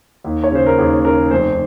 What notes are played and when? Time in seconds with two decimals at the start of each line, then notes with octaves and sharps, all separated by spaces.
0.24 D#2
0.44 C#5
0.52 C#3 C5
0.66 A#4
0.78 D#2 G#4
1.04 C#3 A#4
1.31 F1 C5